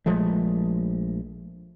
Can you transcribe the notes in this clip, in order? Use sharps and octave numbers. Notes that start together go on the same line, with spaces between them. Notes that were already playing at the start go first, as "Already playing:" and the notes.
A#1 F3 G#3 A3